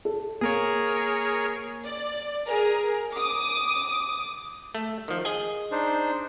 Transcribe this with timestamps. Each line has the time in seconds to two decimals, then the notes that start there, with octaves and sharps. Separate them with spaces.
0.05 A4
0.41 A#3 G#4 A#4 C#5
1.84 D5
2.47 G#4 A#4
3.14 D6 D#6
4.75 A3
5.08 D#3 F3
5.25 G#4 D#5 G#5
5.72 D4 D#4 C5